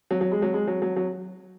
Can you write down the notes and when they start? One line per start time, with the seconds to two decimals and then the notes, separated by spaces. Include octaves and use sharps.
0.11 F#3
0.21 F#3
0.32 G#3
0.42 F#3
0.54 G#3
0.67 F#3
0.82 F#3
0.96 F#3